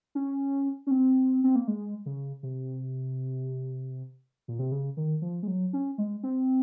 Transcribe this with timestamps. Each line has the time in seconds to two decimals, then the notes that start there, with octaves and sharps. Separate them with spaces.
0.15 C#4
0.87 C#4
0.91 C4
1.44 C4
1.56 A#3
1.68 G#3
2.06 C#3
2.43 C3
4.48 A#2
4.59 C3
4.72 C#3
4.97 D#3
5.22 F3
5.43 G#3
5.47 F#3
5.73 C#4
5.98 G#3
6.23 C4